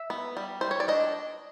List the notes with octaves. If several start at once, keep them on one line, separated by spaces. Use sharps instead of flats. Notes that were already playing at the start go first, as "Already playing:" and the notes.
Already playing: E5
B3
G3
G3 C5
C#5
D5
D4 D#5